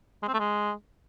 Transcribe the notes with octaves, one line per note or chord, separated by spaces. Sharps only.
G#3
C4
A3
G#3